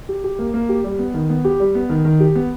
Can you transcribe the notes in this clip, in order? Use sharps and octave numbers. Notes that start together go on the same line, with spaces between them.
G4
G4
A#3
A#3
G4
G3
B3
D#3
B3
G4
G3
B3
D#3
D#3
G4
B3